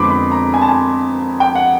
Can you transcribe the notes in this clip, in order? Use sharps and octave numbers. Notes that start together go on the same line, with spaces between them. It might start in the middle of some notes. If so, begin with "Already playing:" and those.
Already playing: F2 D3 F3 G#3 B3 B5 C6 D6
B5
A#5
G#5
A5
G#5
G5
F#5